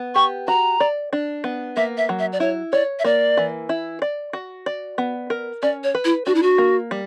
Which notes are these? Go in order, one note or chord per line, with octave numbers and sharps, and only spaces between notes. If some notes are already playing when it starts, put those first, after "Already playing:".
Already playing: B3
G4 C#6
F#4 A#5
D5
D4
B3
A#3 E5
E5
F#3
E5
D5
E4 C#5
C#5 D5
E5
A#3 D5
E3
E4
D5
F#4
D5
B3
A#4
C#4 D5
C#5
B4
E4
D4 F#4
E4
F#4
A#3
G3